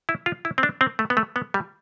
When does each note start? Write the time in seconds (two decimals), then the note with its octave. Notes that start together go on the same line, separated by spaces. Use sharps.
0.09 E4
0.26 F4
0.45 E4
0.58 C4
0.63 D4
0.81 C4
0.99 A3
1.10 B3
1.17 A3
1.36 B3
1.54 G3